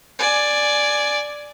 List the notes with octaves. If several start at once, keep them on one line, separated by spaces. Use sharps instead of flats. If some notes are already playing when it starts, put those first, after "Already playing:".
D5 G#5